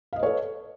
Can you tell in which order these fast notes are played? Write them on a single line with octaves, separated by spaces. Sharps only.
F5 D#5 B4 C#5 A4